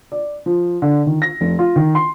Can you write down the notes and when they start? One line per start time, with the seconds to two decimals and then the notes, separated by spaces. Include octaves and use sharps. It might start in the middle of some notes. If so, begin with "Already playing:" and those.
0.12 D5
0.46 F3
0.82 D3
1.07 D#3
1.22 A#6
1.41 F1
1.59 F4
1.76 D#3
1.95 C6